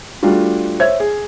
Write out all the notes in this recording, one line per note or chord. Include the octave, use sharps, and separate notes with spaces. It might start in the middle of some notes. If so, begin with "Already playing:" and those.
G3 A3 D4 F4 F#4
C5 C#5 E5 G#6
G#4